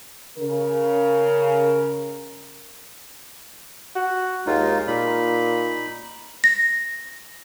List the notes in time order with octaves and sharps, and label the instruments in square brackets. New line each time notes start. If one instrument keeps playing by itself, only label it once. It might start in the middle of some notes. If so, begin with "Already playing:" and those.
[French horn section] C#3 A#4
[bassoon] F#4
[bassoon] D#2 [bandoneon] G#3 D#4 F4
[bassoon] A#2 [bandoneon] D#4 B5
[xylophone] A#6